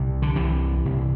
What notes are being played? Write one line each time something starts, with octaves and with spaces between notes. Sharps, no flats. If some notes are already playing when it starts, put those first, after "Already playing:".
Already playing: C2 C3
D3
C2 C3 E3
C2 C3